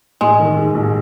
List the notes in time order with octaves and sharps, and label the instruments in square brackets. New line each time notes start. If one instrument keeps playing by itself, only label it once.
[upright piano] A1 [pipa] G#3
[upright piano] D#3
G#2
A1